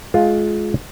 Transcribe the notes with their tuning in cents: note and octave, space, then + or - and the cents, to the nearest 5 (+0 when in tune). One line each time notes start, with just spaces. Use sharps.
G#3 +25 F4 +5